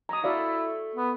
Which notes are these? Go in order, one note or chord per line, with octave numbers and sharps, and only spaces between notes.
F#3 A#5 D#6
A3 E4 F#4 D5 F5
B3